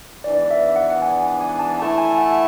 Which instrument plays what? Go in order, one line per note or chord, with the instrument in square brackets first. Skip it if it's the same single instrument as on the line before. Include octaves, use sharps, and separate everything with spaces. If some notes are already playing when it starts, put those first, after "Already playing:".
[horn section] G#2 E3 B3 D4 [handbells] D5
[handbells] E5
F#5
F#5
G#5
G#5
A5
[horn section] E3 A3 E4 [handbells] A5
[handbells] G#5
F#5